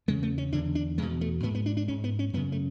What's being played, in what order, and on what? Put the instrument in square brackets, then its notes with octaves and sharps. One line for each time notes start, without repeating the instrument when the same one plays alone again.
[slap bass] E2 C#3 G#3
A3
C#4
E2 D3 D4
D4
E2 B2 G#3
A3
G#2 B3
B3
D4
D4
G#2 C#4
B3
C#4
F#2 C#3 B3
A3